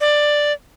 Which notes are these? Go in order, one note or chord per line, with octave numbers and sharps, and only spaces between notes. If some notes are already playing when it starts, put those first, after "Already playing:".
D5